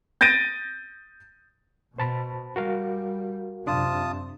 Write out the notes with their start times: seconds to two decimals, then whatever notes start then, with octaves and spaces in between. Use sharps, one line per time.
0.21 G6 A6 A#6 D7 D#7
1.98 B2 C5 A5 B5
2.56 G3 F#4 A#4 F5
3.67 F#2 C3 D4 F4 A5 D#6